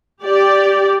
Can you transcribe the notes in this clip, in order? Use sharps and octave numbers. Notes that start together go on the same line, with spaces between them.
G4 D5